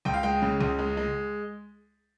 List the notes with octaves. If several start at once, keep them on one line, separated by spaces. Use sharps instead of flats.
C#2 G5
F5
G#3 G5
C#3
C#2
G#3
G#3